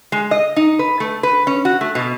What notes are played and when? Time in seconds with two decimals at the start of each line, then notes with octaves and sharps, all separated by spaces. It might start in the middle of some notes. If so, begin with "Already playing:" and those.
0.12 G#3
0.31 D#5
0.56 D#4
0.79 B4
1.00 A3
1.23 B4
1.47 C#4
1.65 F#4
1.81 A3
1.95 B2